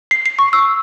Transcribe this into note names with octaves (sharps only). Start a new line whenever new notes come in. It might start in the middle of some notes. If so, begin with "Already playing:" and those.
C7
C7
C#6
E6